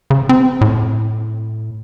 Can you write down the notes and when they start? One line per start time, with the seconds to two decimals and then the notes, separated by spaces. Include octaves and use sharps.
0.10 C#3
0.29 C4
0.61 A2